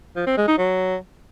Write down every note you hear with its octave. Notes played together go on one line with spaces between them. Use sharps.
F3
C4
G#3
D#4
F#3